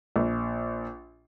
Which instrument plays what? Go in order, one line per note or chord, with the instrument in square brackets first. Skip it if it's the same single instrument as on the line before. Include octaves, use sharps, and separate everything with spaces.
[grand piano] A#1